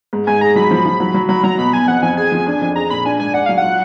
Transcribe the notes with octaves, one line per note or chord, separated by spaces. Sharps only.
G#2
G#2 G#5
G#4 A#5
F#3 B5
F3
F3
F#3
F#3
F#3 B5
F#3 A#5
B2 B5
B2 G#5
F2 F#5
F2 G#5
G#4 G#5
F3
D4
F2
G#4 A#5
A#2 B5
D4 G#5
G#2 G#5
D5 F#5
F#3 F5
F#5
F4